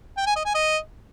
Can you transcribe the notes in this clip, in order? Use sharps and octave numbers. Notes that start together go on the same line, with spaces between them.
G5
G#5
D#5
G#5
D#5